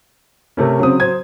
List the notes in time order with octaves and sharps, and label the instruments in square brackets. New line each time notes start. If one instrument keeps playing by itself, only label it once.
[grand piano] C3 A3 C#4 [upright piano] A#4
[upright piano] C#3 C4 [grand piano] F#3 D#6
[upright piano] C5 G#6